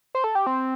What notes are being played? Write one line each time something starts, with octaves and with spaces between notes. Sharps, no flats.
C5
A4
G4
C4